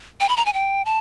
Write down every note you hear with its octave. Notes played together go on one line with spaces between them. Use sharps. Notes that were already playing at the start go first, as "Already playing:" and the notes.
G5
B5
A#5
G#5
G5
A5